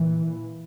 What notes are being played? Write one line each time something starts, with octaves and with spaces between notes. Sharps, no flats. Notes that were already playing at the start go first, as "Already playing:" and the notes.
Already playing: A#2 E3